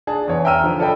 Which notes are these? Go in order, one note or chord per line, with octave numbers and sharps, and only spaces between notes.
D4 G#4 A5
E2 C#5
E5 G5 A#5 E6 F6 D#7
D3 F3
A4 D5 D#5 G5 B5